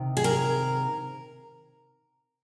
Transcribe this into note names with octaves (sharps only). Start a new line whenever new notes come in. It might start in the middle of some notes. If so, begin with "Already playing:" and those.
Already playing: C3 D#3
G#4
A#4